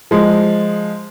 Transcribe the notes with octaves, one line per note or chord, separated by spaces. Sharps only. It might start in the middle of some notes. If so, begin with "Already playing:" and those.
F3 G#3